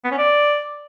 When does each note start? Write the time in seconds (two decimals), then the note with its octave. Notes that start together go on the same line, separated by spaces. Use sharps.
0.05 B3
0.11 C#4
0.18 D5